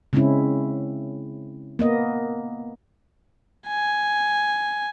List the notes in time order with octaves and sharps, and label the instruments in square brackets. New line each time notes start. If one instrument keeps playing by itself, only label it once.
[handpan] C#3 G#3 C4 C#4 E4
A#3 B3 D#5
[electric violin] G#5